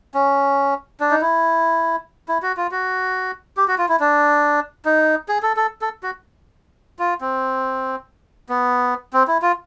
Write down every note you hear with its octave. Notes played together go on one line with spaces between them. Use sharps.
C#4
D4
D#4
E4
E4
F#4
F4
F#4
G4
F#4
F4
E4
D4
D#4
G#4
A4
A4
A4
F#4
F4
C4
B3
C4
E4
F4